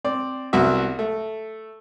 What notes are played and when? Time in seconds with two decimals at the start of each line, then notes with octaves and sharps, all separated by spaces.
0.04 C4 D5
0.53 C2 B3 F#4 E5
0.99 A3